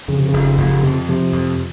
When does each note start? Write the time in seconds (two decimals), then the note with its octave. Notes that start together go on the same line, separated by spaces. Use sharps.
0.08 F2 C#3
0.18 C3
0.29 F1 C#3
0.58 F1
0.83 F2 C3
1.08 C3 F3
1.32 F2